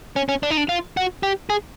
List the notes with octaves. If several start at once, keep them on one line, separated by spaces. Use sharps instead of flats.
C#4
C#4
D4
D#4
D4
F4
F#4
G4
G#4